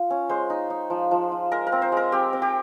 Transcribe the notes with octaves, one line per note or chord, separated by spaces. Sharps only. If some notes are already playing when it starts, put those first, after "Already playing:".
Already playing: F4
C#4
G#3 C5
D#4
D#4
F3
F3
F4
G#3 A#4
A#4
C4
C5
G#3 A#4
C4 G4
C4
G4